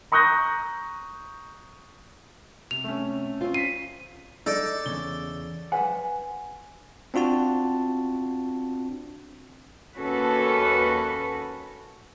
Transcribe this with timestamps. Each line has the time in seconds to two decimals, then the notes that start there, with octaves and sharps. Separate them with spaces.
0.12 A#5 C#6 D#6 F#6 G6 A#6
2.71 C3 F7
2.84 A3 C#4
3.41 C4 C#4 F4
3.54 B6 C7 D#7
4.46 D#4 A4 D5
4.86 E2 A2 C#3 G7
5.72 B4 C5 F#5 G#5
7.14 C4 D4 F4 F#4 A5
9.97 D#2 C#4 F#4 A4 B4